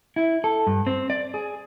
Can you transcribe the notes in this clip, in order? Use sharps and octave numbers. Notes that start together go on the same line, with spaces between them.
E4
A4
G2
C4
D5
G#4